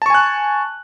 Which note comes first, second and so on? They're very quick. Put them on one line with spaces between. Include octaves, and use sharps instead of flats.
A5 C#6 G#5 F#6